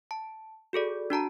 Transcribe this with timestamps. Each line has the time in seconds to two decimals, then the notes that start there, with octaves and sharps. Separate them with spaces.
0.11 A5
0.73 F#4 G#4 A4 D5
1.10 D4 F#4 A5 A#5